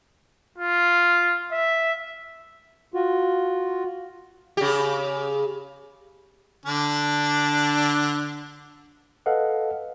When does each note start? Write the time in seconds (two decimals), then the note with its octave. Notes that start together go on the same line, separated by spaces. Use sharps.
0.58 F4
1.52 E5
2.94 F4 F#4
4.57 C#3 G4
6.66 D3 D4
9.26 A4 B4 D#5 F5 F#5